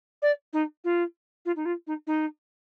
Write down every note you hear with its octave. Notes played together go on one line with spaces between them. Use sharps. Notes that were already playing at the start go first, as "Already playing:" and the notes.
D5
D#4
F4
F4
D#4
F4
D#4
D#4